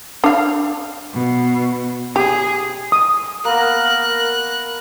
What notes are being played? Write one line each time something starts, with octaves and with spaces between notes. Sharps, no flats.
D4 F5
B2
G4 G#4
D#6
A#3 B3 A#4 F#6